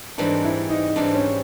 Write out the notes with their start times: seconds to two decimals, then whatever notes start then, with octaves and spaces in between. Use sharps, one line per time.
0.18 G#2 E3 G3 C4 D4
0.44 E4
0.70 D#4
0.96 G#2 E3 G3 C4 D4
1.15 C#4